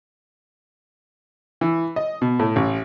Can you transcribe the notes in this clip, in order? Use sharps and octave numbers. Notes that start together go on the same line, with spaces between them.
E3
D#5
B2
A2
A1